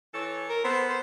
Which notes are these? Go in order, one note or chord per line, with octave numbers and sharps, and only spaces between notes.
E3 A4 C#5
A#4
B3 A4 A#4 C5
C5